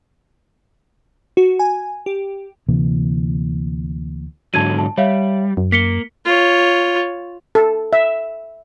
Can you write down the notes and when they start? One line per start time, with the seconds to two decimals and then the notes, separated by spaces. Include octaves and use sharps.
1.37 F#4
1.59 G#5
2.06 G4
2.69 D2 C3 E3 A#3
4.54 G#2 D3 F#3 A5 G#6 D#7
4.79 A5
4.97 G3 C#5 E5 F5
5.57 F#2
5.72 A#3 B6 C#7 G7
6.25 F4 C#5
7.55 A4
7.93 E5